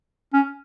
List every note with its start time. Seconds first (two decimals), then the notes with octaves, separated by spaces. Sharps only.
0.33 C#4